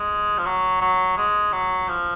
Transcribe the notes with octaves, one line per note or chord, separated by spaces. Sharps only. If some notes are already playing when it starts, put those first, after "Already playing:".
Already playing: G#3
F3
F#3
F#3
G#3
F#3
F3